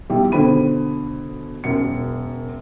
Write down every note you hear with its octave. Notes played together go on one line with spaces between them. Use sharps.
B1 G3 E4
B2 D3 C5 B5 D#7
E1 F#2 C#7